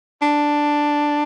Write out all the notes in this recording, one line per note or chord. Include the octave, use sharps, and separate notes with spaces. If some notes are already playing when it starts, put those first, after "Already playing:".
D4